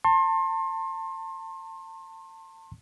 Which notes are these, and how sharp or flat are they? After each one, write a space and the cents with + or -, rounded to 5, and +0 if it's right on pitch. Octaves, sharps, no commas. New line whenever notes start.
A5 +30 C6 +35